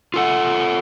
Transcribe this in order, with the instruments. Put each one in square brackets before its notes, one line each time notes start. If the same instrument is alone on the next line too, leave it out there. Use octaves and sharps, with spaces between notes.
[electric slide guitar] F4 A4 F#5